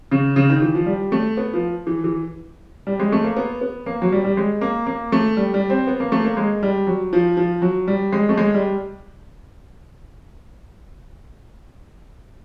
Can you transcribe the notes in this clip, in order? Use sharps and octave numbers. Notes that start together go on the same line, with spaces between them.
C#3
C#3
D#3
E3
F3
G3
A3
B3
F3
E3
E3
G3
G#3
A3
A#3
B3
B3
A#3
F#3
G3
G3
G#3
A#3
A#3
A3
G3
G3
C4
B3
A#3
A3
A#3
G#3
G3
F#3
F3
F3
F#3
G3
G#3
A3
G#3
G3